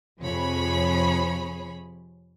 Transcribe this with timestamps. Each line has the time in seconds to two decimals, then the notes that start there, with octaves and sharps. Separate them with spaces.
0.20 F2 C3 F3 G#4 C#5 B5